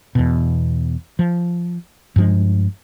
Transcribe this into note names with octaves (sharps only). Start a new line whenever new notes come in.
E2 B2
F3
G2 F3 G#3